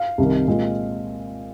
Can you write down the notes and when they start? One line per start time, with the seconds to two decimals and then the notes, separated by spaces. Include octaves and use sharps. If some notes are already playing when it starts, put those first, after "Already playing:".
Already playing: F5
0.18 C2 C3 D#3
0.47 A#2 G#3 C4